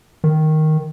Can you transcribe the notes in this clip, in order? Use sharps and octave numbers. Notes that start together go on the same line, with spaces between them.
D#3